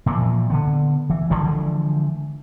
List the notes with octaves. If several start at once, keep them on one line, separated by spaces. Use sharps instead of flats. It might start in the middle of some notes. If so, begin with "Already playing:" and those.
A#2 E3 F3
D3 B3
E3
D3 E3 F3 G#3